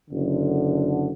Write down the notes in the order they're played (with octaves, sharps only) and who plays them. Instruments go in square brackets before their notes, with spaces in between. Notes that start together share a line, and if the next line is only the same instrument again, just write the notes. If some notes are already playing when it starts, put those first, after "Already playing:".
[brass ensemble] F#1 F#2 D3